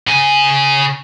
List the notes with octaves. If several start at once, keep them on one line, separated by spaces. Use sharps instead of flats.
C#3 G#5